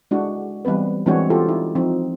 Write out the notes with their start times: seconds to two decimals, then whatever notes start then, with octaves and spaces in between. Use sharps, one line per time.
0.11 G#3 D4 E4 F#4
0.65 E3 G3 B3 C4 B4
1.06 E3 G#3 C4 D4 F#4 C#5
1.30 E4 F4 G4 A4
1.49 D#4 E4
1.75 F3 C4 D#4 E4